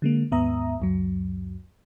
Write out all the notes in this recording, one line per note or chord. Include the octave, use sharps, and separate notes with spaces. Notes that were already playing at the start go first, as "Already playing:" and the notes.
D3 G#3 A#3
D#2 G#2 B3 E5 A#5 D#6
C#2 F#2 F#3